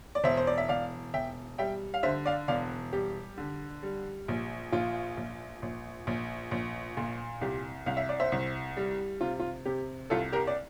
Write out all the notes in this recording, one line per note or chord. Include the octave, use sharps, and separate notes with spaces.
D5
E1 C5 E5
C5
D5
E5
E1 D5 F5
E1 E5 G5
G3 E5 G5
F5
D3 C5 E5
D5 F5
E1 D5 F5
G3 G4
D3
G3
A#1
A#1 F4
A#1
A#1
A#1
A#1
A#2
C2 G4
C2 F5
E5
D5
C5 E5
C2
G3
C3 F4
F4
C3 G4
C2 F4 A4
G4 A#4
D5